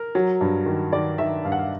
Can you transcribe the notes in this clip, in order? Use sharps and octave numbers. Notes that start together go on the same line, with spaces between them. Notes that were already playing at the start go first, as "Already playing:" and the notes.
Already playing: A#4
F#3
G2
D#3
D#3 D5
D#3 E5
G2 F5
F#5
F5